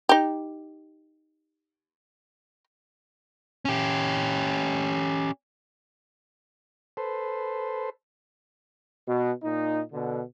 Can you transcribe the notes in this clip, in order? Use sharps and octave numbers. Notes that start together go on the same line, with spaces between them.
D#4 G4
C#4 G4
A4 B4 C5
B2
A#2 D#4
B2 D3